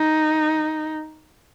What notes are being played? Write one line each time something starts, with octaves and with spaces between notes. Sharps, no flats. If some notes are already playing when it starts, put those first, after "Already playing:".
Already playing: D#4